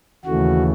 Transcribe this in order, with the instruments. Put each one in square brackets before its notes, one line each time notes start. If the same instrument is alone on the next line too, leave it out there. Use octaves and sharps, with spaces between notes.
[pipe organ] D#2 C#3 E3 A3 F#4